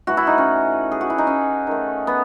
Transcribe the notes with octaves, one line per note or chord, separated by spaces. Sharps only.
A2 E3 A3 F#4
E4
D#4
C#4
G#4
F#4
E4
D#4
C#4
D#3 A3
B3